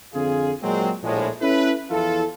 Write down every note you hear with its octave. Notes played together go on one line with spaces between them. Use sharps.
F2 D3 C4 F4 G#4
A#2 F#3 G#3 C4
A#1 A2 G#3
C#4 E4 A4 B4
E2 F3 E4 F4 A4